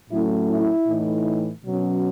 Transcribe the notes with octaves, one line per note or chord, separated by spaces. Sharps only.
A2 F#3 A3 C#4 E4
E4
A2 E3 A3 D#4
B2 F#3 C#4